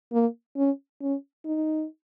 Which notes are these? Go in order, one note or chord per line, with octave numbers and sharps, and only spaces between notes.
A#3
C#4
C#4
D#4